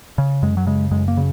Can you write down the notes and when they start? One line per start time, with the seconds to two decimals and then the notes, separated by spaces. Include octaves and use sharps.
0.18 C#3
0.42 F#2 G#3
0.57 F#3
0.67 C#3 G#3
0.91 F#2 G#3
1.08 A#3
1.17 C#3